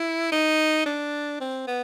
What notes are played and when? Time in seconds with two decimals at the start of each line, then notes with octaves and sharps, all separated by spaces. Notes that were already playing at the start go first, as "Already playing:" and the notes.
Already playing: E4
0.32 D#4
0.86 D4
1.41 C4
1.67 B3